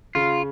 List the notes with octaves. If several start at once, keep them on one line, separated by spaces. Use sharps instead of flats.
C#3 F4